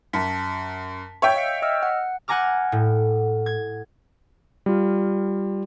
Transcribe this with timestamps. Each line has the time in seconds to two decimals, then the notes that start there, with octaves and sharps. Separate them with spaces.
0.13 F#2 A5 B6
1.22 C#5 E5 G5
1.34 D#5 F5 C#7
1.62 D#5 E6 F6
1.83 F#5
2.28 F#5 G#5 A#5 D6 F6
2.72 A2
3.46 G#6
4.66 G3 F4